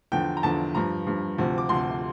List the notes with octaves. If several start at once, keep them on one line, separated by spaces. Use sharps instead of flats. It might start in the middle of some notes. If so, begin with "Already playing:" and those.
E2 D3 F3 G5
A#5
E2 D3 F3 A5
G2 F3 A#5
G2 F3
D2 C3 F3
D6
D2 C3 F3 C6